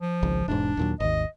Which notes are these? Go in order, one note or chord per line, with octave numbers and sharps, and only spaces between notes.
F3
G#1 C#2 G#2
E1 G#2 D4
D#2 A#2 F#3
G#1 D#2 D#5